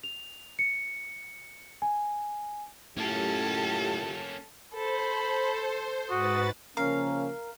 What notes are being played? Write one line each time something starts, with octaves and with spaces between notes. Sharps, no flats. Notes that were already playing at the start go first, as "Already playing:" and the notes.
F7
C#7
G#5
F#2 A2 A#3 C#4 F4 G4 A4
A4 C5 B5
G#2 F#4 B4 D#6 A6
C#3 F3 A#3 C#4 A#4 F5